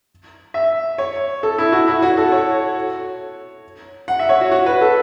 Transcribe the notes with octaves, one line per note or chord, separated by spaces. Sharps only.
E5
C#5
A4
E4
F#4
E4
F#4
A4
C#5
F#5
E5
C#5
F#4
F#4
B4
A4